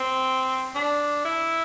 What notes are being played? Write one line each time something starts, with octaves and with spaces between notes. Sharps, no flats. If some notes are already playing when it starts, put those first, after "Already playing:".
Already playing: C4
D4
E4